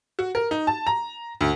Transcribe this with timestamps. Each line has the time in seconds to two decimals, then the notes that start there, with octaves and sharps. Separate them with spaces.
0.19 F#4
0.35 A#4
0.51 D#4
0.67 A5
0.87 A#5
1.41 D2